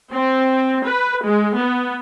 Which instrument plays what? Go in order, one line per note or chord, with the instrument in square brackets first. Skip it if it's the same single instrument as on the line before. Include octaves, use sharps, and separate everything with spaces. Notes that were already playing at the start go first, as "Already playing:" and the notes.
[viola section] C4
B4
G#3
B3